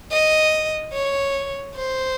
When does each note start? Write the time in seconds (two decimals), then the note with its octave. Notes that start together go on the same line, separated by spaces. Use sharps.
0.11 D#5
0.93 C#5
1.75 C5